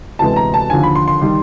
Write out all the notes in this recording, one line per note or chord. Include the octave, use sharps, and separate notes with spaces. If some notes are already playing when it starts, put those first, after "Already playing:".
D2 C3 E3 G#3 B3 A5
A#5
A5
D#2 D3 F3 G#5
B5
C6
C6
D#3 G3